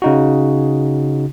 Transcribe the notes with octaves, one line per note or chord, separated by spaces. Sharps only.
C#3 D#4 F#4